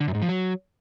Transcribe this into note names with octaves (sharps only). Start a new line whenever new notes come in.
D3
F#2
G#2
F3
F#3